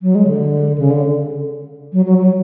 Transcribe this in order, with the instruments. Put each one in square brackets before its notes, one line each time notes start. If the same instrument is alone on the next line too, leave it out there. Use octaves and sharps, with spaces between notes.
[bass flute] F#3
G#3
D3
C#3
D3
F#3
F#3
F#3